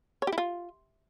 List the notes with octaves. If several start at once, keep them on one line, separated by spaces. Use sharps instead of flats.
C#5
G4
E4
F4